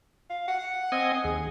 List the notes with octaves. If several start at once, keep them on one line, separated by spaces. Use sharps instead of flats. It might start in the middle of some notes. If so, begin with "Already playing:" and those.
F5
F#5
C4 D#5 G#5
D#2 G#4